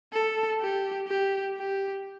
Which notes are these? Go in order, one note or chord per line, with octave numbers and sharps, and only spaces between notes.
A4
G4
G4
G4